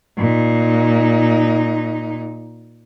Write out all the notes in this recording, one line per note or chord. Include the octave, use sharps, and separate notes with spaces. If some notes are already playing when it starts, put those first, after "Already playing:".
A#2 D#4